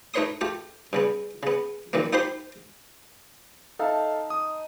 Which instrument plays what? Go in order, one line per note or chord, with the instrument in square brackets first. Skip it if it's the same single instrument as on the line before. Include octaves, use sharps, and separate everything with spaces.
[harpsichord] A3 D#4 B4 C#5 C6 D#6
A3 F4 G4
G2 C#3 B3
C#3 B3
F#2 D#3 E3 A#3
D#4 F4 G4 C5 B5 C6
[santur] D#4 A5 [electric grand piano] A4 E5 F5
[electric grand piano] D#6